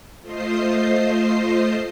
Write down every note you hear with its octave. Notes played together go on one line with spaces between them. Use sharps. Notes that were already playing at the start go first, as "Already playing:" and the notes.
A3 F4 C5 D#5 C7